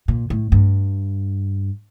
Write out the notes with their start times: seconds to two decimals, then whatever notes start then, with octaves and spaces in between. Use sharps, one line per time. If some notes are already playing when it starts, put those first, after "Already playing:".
0.08 A#2
0.30 A2
0.52 G2